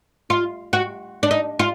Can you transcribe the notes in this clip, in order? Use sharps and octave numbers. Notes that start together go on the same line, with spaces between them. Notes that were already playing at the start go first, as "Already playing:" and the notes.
F4
F#4
D4
D#4
F4